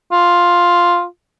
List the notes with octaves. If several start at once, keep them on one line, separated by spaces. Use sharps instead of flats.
F4